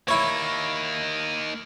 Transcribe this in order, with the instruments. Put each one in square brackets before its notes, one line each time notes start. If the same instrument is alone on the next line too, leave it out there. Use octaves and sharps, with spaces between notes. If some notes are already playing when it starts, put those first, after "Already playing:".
[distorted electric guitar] A#3 D#4 [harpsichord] E4 C#5